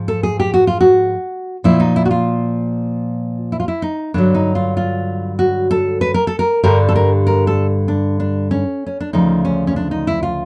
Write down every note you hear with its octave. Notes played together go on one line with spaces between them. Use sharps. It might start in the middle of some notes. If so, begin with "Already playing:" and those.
Already playing: G#2 F3
A4
G#4
G4
F#4
F4
F#4
A#2 F3 E4
D#4
E4
F#4
F4
E4
F4
E4
D#4
G2 D3 F#3 D4
D#4
F4
F4
F#4
A4
B4
A#4
A4
A#4
G2 D3 G3 A#4
A4
A#4
A#4
A4
D4
D4
C#4
C#4
D4
D2 C#3 F3 D#4
C#4
C#4
D4
D#4
E4
F4